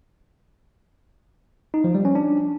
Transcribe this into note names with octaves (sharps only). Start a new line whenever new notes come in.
D#4
F3
G3
C#4
D4